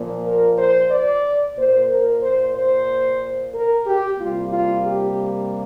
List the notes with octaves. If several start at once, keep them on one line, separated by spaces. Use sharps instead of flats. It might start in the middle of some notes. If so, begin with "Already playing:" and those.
Already playing: A#2 F3 A#3
A#4
C5
D5
A#2 A#3 C5
A#4
C5
C5
A#4
G4
C3 G3 A#3 F4
F4
G4